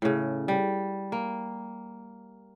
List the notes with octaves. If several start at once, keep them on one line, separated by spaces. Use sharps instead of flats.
A2 C#3
G3
A#3